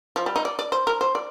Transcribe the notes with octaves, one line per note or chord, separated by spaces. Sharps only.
F3
G3
D#4
D5
D5
C5
A#4
C5
D5